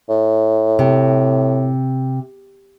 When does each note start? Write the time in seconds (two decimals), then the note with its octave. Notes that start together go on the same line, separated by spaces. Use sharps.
0.09 A2
0.79 C3